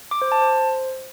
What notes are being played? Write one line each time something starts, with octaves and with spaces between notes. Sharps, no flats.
D6
C5
A5
C5